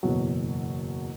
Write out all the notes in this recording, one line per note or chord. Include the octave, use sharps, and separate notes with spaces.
F#1 E2 B2 F#3